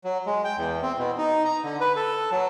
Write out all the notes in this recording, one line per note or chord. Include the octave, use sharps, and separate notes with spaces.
F#3
G#3
G5
E2
C4
B2
D#4
A#5
D3
B4
A4
F#3